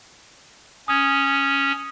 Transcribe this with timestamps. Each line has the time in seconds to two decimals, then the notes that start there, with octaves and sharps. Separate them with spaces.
0.88 C#4 D#6 G#6